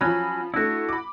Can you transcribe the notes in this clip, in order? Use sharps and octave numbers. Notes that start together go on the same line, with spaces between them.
F3 F#3 C#4 B5
A3 D4 E4 F#4
B5 D6